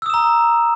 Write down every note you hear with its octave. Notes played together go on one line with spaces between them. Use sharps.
A#5 D#6 E6 E7